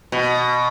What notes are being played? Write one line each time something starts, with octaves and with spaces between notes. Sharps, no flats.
B2